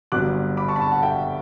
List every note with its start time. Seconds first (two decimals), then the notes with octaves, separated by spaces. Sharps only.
0.12 G1 G2 F#3 B3 D6 F#6
0.57 B5 D6
0.68 A5 C#6
0.76 B5
0.80 A5 C#6
0.92 F#5 A5
1.03 E5 G5